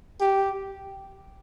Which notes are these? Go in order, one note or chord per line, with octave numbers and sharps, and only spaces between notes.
G4